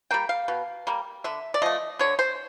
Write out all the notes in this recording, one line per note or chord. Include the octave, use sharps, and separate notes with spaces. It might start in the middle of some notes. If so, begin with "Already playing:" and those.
G3 A#3 G5
F5
B2
G3 A#3
D3 E5
D5
F3 A3 D#5
D3 C#5
C5